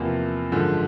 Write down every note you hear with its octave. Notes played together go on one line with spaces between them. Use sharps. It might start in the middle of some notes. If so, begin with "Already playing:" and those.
Already playing: E2 C3 F3 A#3
G#1 F#2 D3 F3 G#3